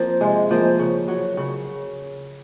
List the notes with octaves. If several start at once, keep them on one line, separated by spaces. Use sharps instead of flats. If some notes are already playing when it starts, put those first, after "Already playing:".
Already playing: F3 A#3 C4
C3 G#3
F3 A#3
C#3
F#3
C#3